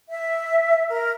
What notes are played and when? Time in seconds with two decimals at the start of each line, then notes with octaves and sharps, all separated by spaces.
0.09 E5
0.88 A#4